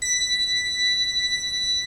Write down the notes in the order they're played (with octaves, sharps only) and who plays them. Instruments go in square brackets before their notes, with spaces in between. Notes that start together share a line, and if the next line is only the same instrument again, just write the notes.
[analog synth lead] B6